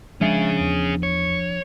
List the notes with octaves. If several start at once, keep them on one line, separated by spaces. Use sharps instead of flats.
F3 G#3 C#4 D4 G#4 E5 A6
E2
C#5